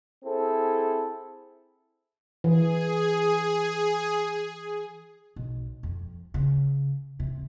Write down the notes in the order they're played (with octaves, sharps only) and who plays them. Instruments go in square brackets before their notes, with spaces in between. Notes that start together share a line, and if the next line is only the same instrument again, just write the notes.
[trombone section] C4 E4 G#4 A4
[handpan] E3 [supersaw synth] G#4
[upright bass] B1
F2
C#3
C3